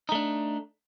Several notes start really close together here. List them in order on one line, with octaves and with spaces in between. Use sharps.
D#4 A3 D4